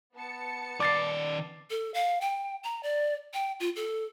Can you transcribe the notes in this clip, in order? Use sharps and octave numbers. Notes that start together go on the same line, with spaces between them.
B3 A5 C#7
D#3 D5 D6 A6 C7
A4
F5
G5
A#5
D5
G5
F4
A4